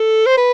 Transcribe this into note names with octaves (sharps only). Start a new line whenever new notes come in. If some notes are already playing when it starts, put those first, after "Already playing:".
Already playing: A4
C5
B4